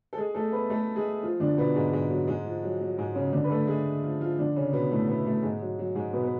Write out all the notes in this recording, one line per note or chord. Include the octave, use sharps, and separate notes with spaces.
A4
G#3 G#4
A3 A4
B3 B4
A3 A4
G#3 G#4
F3 F4
D3 D4
B2 B3
G#2 G#3
G#2 G#3
F#3
G#2 G#3
F3
F#3
F#3
G#2 G#3
C#3 C#4
D3 D4
B4
A3 A4
G#3 G#4
F3 F4
F3 F4
D3 D4
C#3 C#4
B2 B3
A2 A3
B2 B3
A2 A3
G#2 G#3
F#3
F#3
G#2 G#3
B2 B3
B3